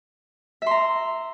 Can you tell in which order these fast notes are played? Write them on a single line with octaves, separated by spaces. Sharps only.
E5 C6 A#5